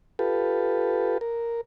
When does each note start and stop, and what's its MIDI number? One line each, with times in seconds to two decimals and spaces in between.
0.19 1.18 65
0.19 1.18 67
0.19 1.18 69
0.19 1.18 71
1.21 1.61 70